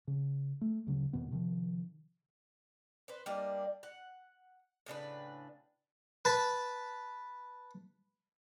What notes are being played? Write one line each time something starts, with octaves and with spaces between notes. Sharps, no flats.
C#3
A3
D2 C#3 F#3
E2 B2 D#3 B3
C3 D#3 F3
B4 C5
G3 A#3 D4 D#5
F#5
A2 C#3 D4 B4
B4 A5 B5